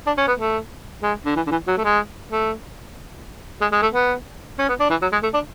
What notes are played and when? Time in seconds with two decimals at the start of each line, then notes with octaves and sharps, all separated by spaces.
0.06 D4
0.17 C#4
0.27 B3
0.38 A3
1.03 G#3
1.25 D3
1.36 E3
1.46 D3
1.51 E3
1.67 F#3
1.77 A3
1.84 G#3
2.32 A3
3.61 G#3
3.72 G#3
3.82 A3
3.94 B3
4.59 C#4
4.68 B3
4.80 D4
4.90 E3
5.02 F#3
5.12 G#3
5.23 A3
5.33 D4